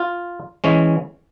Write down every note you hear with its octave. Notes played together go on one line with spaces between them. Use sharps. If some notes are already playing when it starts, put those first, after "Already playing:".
Already playing: F4
E3 G#3 C#4